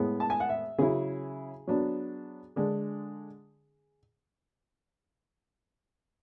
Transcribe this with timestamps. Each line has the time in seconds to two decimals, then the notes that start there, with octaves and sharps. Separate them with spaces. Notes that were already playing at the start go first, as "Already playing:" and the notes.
Already playing: A2 G#3 B3
0.20 A5
0.30 G#5
0.40 F#5
0.49 E5
0.78 C#3 F#3 C#4 E4 G#4
1.67 F#3 B3 D4
2.56 D3 G#3 D4